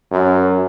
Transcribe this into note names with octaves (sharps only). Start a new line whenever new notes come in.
F#2